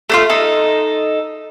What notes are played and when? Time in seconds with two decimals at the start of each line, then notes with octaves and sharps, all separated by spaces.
0.10 A3 D4 F4
0.30 D#4 A4